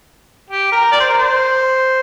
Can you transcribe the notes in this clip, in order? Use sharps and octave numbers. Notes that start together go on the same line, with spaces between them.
G4
A#4
D5
C5
A#4
C5